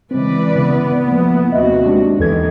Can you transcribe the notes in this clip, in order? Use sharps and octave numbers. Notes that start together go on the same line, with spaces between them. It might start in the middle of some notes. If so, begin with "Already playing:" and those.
C#3 E3 G#3 C4 B4 D5
C#3 B3
F3 A3 A#3 E4
D#2 C3 F#4 D#5 E5
G#3 D4 G4
E2 D#3 E3 A4 G#6